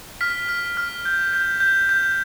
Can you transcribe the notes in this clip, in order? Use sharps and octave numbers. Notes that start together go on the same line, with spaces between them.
F6 B6
F6
F6
G6
G6
G6
G6